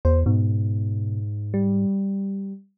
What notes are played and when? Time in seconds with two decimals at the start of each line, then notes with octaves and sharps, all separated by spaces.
0.05 E2 C5
0.26 G#2 B2
1.54 G3